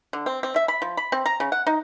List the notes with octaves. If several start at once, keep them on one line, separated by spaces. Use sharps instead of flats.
D3
C4
C4
E5
B5
F3
B5
C4
A#5
C#3
F#5
D#4